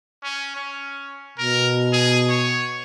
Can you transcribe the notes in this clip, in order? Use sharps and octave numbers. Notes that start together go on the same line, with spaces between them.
C#4
C#4
B2 A#4
G#4
C#5